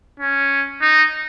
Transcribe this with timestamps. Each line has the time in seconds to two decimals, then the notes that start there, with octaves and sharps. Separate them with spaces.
0.20 C#4
0.81 D#4